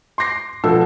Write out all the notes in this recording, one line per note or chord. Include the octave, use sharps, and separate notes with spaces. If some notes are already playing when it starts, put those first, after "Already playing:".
C6 D6 A#6 C7
B2 F3 B3 F4 A4 E6